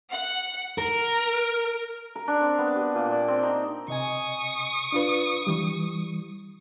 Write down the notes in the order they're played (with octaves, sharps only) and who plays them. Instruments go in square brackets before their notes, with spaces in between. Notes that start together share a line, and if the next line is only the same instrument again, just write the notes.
[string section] F#5
[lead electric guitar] A#4
[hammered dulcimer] A#4
D4
C4
B3
G4
A#2
D5
C4
D#4
[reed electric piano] C3 D#5 G#5 [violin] C#6 D#6
[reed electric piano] D4 F4 B4
E3 G3